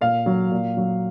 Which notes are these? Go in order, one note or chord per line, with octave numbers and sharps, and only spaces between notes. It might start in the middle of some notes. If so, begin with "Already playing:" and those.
A#2 F5
F#3
A#2
F#3